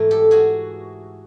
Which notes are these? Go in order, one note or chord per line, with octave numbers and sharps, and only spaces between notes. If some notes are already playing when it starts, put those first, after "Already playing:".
Already playing: G#2 E3 A3
G4 A4
F#4 G#4